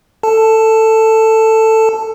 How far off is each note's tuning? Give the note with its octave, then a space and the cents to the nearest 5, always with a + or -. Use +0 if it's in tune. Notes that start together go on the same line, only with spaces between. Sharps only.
A4 +15 A5 +0